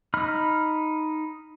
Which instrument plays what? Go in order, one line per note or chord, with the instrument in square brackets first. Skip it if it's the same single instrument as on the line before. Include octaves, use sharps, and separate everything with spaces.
[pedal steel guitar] D#4 B5 F6